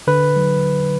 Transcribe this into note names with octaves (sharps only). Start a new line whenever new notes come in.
D3 B4
F#3